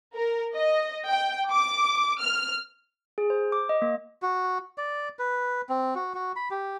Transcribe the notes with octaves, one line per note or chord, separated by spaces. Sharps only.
A#4
D#5
G5
D6
F6
G#4
C5
D6
D#5
A#3
F#4
D5
B4
C4
F#4
F#4
B5
G4